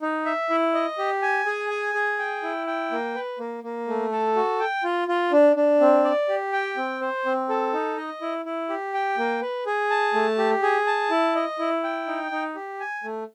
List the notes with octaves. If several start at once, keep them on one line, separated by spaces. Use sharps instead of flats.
D#4
E5
E4
D#5
G4
G#5
G#4
G#5
G#4
G5
E4
G5
A#3
B4
A#3
A#3
A3
A4
F#4
G5
F4
F4
D4
D4
C4
D5
G4
G5
C4
C5
C4
A4
D#4
D#5
E4
E4
G4
G5
A#3
B4
G#4
A5
A3
G4
G#4
A5
E4
D#5
E4
G5
D#4
D#4
G4
G#5
A3